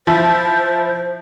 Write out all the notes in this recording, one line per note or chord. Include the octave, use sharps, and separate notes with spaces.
F3 E4 C5